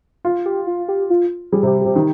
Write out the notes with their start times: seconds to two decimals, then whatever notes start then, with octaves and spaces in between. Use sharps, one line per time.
0.25 F4
0.46 G4
0.67 F4
0.88 G4
1.10 F4
1.52 G3 G#4
1.63 C3
1.67 G4
1.81 C3 G4
1.96 D#3